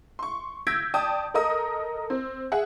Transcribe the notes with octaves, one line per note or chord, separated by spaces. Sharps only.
C6 C#6
E6 G6 G#6 A#6 B6 D7
D5 G5 A5 D#6
A4 A#4 D#5 D#6
C4
G#4 E5 F#5